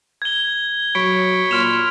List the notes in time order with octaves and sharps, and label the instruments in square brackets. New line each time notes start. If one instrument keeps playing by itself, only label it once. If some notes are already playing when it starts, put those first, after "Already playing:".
[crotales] G#6 G7
[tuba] F#3 [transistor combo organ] C#5 B5 [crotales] D7
[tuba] A#2 [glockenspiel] C6 F6 E7 [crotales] D7 F7